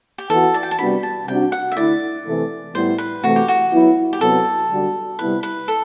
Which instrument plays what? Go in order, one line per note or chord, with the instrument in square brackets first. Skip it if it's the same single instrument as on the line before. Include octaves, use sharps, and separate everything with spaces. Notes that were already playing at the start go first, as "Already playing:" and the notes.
[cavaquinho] G4
[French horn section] E3 B3 F#4 [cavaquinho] A4
[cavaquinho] D5
G5
A5
[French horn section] C3 G3 B3 D4 F#4 [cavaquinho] B5
[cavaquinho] A5
[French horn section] C3 G3 D4 F#4 [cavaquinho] G5
[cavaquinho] F#5
E5
[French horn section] D3 A3 E4 [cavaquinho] D5
[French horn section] C3 E3 A3
[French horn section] A2 G3 B3 E4 [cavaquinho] C5
[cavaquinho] B4
[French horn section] C3 E3 A3 [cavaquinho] F#4
[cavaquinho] G4
F#4
[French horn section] F#3 B3 E4
[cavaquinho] G4
[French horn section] C3 F#3 B3 [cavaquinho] A4
[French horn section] D3 G3 D4 F#4
[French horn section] C3 G3 B3 E4 [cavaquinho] B4
[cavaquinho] B4
A4